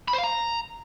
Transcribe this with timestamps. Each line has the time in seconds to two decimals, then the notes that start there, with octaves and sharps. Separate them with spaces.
0.08 B5
0.13 C5
0.18 F5
0.24 A#5